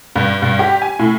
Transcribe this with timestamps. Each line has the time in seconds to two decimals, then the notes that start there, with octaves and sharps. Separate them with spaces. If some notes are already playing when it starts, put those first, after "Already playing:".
0.16 G2
0.42 G2
0.59 G4
0.82 G#5
0.99 A2